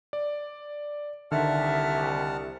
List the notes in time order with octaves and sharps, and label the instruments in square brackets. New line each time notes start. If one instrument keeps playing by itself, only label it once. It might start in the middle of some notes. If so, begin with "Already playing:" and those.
[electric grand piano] D5
[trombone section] C2 [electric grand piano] D3 D#3 [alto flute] E5 [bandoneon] F#5 A5 F6